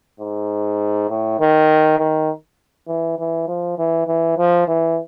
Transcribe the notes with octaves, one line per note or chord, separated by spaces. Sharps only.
G#2
A2
D#3
D#3
E3
E3
F3
E3
E3
F3
E3